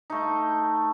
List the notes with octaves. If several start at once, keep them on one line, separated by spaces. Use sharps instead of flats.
A3 D#4